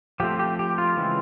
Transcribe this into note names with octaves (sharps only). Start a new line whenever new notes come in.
F3 A3 C4 G4
G4
G4
F4
C#3 E3 G#3 C4